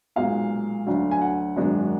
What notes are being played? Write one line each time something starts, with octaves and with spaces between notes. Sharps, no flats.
B1 A#2 G#3 D#4 F5
D2 D3 F#3 D4
G#5
F#5
G#1 F#2 D#3 G#3 D4